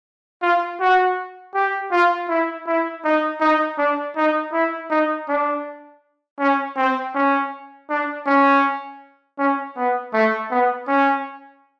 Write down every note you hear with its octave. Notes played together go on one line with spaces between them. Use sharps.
F4
F#4
G4
F4
E4
E4
D#4
D#4
D4
D#4
E4
D#4
D4
C#4
C4
C#4
D4
C#4
C#4
B3
A3
B3
C#4